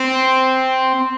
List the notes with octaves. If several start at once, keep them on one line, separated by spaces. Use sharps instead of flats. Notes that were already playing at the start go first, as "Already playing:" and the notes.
Already playing: C4